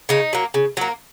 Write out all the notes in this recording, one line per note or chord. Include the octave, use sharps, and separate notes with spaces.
C#3 D#4
F#3 A#3
C#3
F#3 A#3